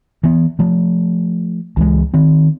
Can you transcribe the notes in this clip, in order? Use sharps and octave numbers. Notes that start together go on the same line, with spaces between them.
E3 B3
F3 A3
C#2 E3 G#3
D#3 C4